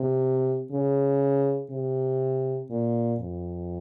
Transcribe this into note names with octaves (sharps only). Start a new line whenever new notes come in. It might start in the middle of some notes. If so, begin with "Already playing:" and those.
Already playing: C3
C#3
C3
A#2
F2